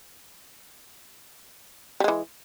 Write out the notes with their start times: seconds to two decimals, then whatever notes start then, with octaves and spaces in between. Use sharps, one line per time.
2.00 G3
2.04 G#3
2.08 E3